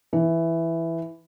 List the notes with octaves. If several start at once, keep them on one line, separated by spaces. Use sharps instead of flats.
E3